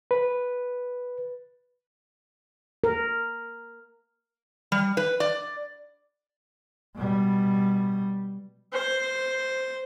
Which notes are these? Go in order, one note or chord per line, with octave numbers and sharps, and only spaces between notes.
B4
A#4
G3
B4
D5
B2 G3
C5